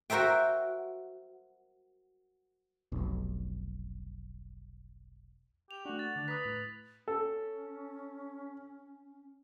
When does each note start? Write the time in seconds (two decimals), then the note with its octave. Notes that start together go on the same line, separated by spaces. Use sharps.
0.10 F#4 A#4 C5 E5 G5
2.92 F1 B1
5.71 G4 F7
5.85 A3 D4 F#4
5.99 A6
6.16 D3 D4
6.28 B4 A#5 D#6 B6
6.45 A2
7.08 C#4 A4